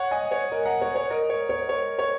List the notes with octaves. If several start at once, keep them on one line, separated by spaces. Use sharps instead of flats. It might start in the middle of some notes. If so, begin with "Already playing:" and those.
Already playing: C#5 F#5
D#5 G#5
C#5
A#4 D#5
F#5 A#5
C#5
C#5
A#4 D#5
C#5
C#5
C#5
C#5